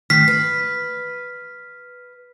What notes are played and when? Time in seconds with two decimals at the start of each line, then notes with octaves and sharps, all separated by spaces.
0.10 D#3 A3 F6 B6 C7
0.28 B4